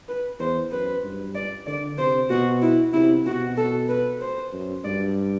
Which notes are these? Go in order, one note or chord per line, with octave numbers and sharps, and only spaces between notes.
B4
E2 C5
F#2 B4
G2
D5
D3 D5
C3 C5
B2 F#4
E4
C3 E4
B2 F#4
A4
B4
C5
F#2
G2 D5